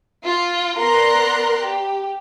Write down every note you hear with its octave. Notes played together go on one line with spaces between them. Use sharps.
F4
B3 A#4 D5 A#5 C6 F#6
G4